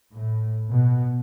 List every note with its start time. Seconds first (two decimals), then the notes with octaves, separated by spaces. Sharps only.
0.16 A2
0.70 B2